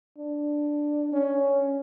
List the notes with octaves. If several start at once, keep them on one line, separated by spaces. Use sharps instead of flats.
D4
C#4